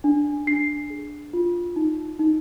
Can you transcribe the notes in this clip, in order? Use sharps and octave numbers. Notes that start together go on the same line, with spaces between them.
D4
D4 C7
G#4
F4
D#4
D#4